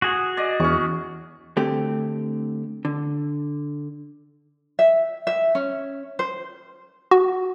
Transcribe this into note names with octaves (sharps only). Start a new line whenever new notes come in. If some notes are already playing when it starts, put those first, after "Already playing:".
F#4 G#4
D5 D#5
E2 C#4 C#6
D3 A3 C4 G4
D3
E5
E5
C#4
C5
F#4